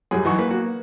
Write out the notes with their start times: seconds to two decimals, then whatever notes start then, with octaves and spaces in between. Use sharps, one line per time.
0.11 F#2 F#3 G3 G#4
0.25 E3 F#3 D#4 F#4 G#5 C#6
0.39 A#3 B4
0.50 B3 F#4